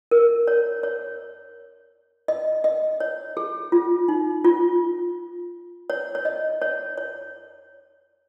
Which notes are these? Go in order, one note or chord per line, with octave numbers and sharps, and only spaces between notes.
A#4
C#5
C#5
D#5
D#5
C#5
G#4
F4
D#4
F4
C#5
C#5
D#5
C#5
C#5